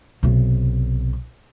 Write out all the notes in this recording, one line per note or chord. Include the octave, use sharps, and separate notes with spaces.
B1 C3